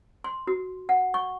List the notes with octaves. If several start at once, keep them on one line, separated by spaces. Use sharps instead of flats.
C6
F#4
F#5
C#6